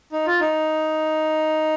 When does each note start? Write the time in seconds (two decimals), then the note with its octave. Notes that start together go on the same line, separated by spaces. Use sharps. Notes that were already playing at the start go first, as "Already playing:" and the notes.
0.12 D#4
0.26 F4
0.40 D#4